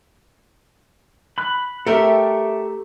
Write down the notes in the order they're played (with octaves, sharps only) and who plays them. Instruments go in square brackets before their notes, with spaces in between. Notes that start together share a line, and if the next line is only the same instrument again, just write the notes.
[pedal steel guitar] B5 F#6
[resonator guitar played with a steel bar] A3 G4 A#4 [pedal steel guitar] A4 E5